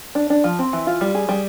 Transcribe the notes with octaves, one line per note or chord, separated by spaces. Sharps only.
D4
D4
F3
C4
E3
F4
G3
G#4
G3